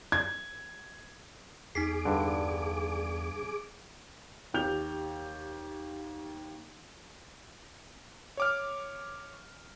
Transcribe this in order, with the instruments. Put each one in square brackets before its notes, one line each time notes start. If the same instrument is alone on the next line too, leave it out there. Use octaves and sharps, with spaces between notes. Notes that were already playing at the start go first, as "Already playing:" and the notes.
[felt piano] G#6
[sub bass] E2 [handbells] D#4 B6 C7 [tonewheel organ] G#4 D6
[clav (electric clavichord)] G2 D3
[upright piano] D#2 G4 G6 F7
[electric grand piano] C#5 D6 F6